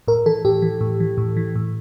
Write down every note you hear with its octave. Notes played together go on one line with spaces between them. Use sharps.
A2 A#4
E3 A4
A2 G4
E3
A2
E3
A2
E3
A2